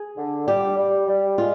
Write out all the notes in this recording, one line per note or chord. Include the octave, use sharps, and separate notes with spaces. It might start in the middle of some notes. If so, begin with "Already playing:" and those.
Already playing: G#4
D3
G3 G4
G3
G3
G#3 F4